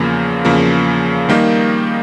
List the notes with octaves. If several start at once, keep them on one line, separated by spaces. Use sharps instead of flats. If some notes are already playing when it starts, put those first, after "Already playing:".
Already playing: E2 C#3 F3 A#3
E2 C#3 F3 A#3
D#3 G3 A#3 D#4